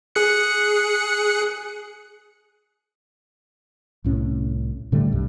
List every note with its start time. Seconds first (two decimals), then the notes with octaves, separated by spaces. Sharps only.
0.15 G#4 F#6 C#7
4.04 C2 A2 C#4
4.92 A2 D3 G3 A3
5.11 C2 G2 G3